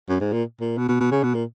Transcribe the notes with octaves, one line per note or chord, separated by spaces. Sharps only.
F#2
G#2
A#2
A#2
B2
B2
B2
C#3
B2
A#2